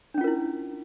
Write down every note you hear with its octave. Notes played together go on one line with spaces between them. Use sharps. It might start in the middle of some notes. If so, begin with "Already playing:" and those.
C#4 D4 E4 F4 A#4